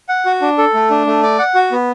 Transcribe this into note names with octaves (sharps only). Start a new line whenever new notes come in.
F#5
F#4
D4
A4
A3
D4
A3
D5
F#5
F#4
B3